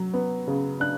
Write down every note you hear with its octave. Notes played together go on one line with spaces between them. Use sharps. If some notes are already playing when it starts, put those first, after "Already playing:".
Already playing: F#3
B3
C#3
D4 F#6